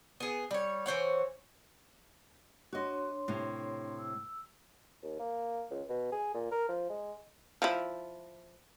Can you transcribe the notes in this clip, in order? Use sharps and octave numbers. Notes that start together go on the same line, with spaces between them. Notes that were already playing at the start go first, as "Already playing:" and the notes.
B3 G#4
G3 C#5
E3 C5 C#5 F#5
D4 F#4 C#5 D#5 C6
A2 C3
E6
D#2
A#3
C#2
B2
G#4
A#2
A#4
F3
G#3
F3 E4